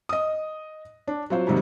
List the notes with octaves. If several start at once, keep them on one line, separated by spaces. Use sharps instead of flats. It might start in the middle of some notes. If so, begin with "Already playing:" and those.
D#5 D#6
D4
F#3 C4 F4 C5
G#2 C3 D#3 F#3 G3